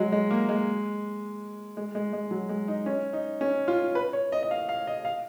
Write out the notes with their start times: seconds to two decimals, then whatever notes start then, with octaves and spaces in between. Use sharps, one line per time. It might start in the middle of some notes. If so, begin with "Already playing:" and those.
Already playing: F#3 G#3
0.12 G#3
0.31 A#3
0.49 G#3
1.77 G#3
1.95 G#3
2.13 G#3
2.31 F#3
2.49 G#3
2.68 D#4
2.86 C#4
3.13 D#4
3.41 C#4
3.68 F4
3.95 B4
4.13 C#5
4.32 D#5
4.43 D#5
4.51 F5
4.69 F5
4.87 D#5
5.05 F5